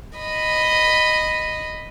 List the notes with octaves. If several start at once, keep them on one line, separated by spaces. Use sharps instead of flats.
D#5 B5